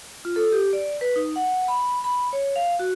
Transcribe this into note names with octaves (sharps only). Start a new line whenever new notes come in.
F4
A4
G4
D5
B4
D#4
F#5
B5
B5
C#5
F5
F#4